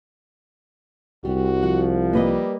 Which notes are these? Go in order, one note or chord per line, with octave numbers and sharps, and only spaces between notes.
C2 G3 F#4
F3 F#5
G3 A#3 B4 D#5